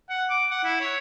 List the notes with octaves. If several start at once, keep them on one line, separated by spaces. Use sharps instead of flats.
F#5
D6
F#5
E4
C#5